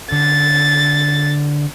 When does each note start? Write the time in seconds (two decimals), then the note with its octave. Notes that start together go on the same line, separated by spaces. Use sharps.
0.12 D3 A6